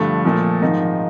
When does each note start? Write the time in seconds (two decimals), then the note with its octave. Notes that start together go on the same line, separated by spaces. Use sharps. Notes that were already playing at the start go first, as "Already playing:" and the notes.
Already playing: G2 D3 F3 A3
0.25 A#2 F3
0.61 G#2 D#3 F3 D#4